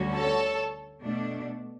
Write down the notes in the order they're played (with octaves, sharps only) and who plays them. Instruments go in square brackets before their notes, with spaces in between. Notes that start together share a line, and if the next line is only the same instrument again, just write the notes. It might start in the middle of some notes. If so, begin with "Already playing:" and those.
Already playing: [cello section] D2 D3 G3 C#4 F#4
[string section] A4 C#5
[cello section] B2 A3 D4